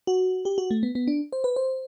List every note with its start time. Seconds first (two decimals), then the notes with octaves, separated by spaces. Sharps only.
0.07 F#4
0.45 G4
0.58 F#4
0.71 A3
0.83 B3
0.95 B3
1.07 D4
1.32 C5
1.44 B4
1.56 C5